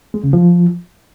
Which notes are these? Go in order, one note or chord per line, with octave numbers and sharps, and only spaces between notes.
G#3
C#3
F3